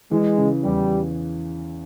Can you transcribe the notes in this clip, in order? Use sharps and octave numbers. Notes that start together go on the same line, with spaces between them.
E3 G#3
C#3
E2 G3